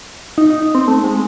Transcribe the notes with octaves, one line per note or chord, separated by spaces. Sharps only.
D#4
D#4
C4
A3
G#3